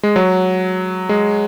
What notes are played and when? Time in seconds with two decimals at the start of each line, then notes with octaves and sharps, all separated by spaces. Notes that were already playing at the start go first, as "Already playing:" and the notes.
0.03 G#3
0.16 F#3
1.09 G#3